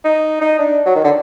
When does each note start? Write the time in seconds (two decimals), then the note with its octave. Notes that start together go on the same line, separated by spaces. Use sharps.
0.04 D#4
0.41 D#4
0.58 D4
0.86 F#3
0.95 D#3
1.04 D3